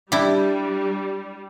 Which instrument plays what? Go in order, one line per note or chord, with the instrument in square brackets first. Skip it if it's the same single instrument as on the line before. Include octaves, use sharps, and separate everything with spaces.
[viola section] G3 [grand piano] D4 [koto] E4 G4